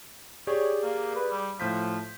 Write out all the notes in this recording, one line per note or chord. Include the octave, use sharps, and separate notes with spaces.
G4 G#4 C#5 D5
A#3
B4
G3
A2 F3 G6 B6